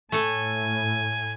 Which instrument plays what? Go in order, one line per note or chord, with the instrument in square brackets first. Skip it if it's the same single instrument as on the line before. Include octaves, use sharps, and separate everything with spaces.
[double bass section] A2 [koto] A3 A4 [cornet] G#5